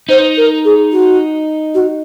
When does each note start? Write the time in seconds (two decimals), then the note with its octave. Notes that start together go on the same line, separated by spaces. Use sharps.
0.09 D#4 C5
0.37 A#4
0.65 G#4
0.92 F#4
1.74 F#4